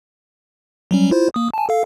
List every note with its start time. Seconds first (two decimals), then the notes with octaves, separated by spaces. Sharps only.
0.91 F#3 G3 C#4
1.11 E4 F4 C5
1.34 A#3 D#6
1.54 G#5 A5
1.69 A4 F5